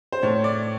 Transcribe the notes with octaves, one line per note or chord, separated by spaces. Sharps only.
C5
A2 C#5
D5